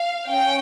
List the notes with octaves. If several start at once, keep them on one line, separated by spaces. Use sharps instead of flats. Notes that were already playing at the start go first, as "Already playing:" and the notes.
Already playing: F5
C#4 G5